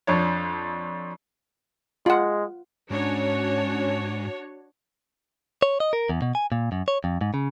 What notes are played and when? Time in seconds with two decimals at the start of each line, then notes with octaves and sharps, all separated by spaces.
0.07 F2 D4 C#5
2.06 G#3 F4 F#5
2.91 G#2 C#4 D4 F#4 C#5
5.62 C#5
5.80 D#5
5.93 A#4
6.09 E2
6.22 B2
6.35 G#5
6.52 A#2
6.72 F#2
6.88 C#5
7.04 F2
7.21 G#2
7.34 C#3